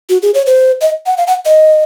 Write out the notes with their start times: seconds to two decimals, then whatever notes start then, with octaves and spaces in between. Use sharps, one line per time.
0.09 F#4
0.22 G#4
0.34 C#5
0.46 C5
0.81 D#5
1.06 F#5
1.18 F5
1.27 F#5
1.45 D#5